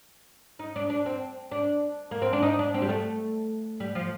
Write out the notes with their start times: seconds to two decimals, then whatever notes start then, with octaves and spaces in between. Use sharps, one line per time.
0.59 D#4
0.76 D4
0.90 D4
1.06 C4
1.51 D4
2.11 A#3
2.22 C4
2.33 D4
2.42 D#4
2.59 D4
2.74 C4
2.82 G3
2.89 A3
3.80 G3
3.95 F3